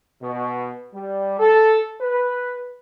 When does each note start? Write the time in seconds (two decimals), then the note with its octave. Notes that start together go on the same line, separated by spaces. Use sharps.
0.21 B2
0.93 G3
1.39 A4
2.00 B4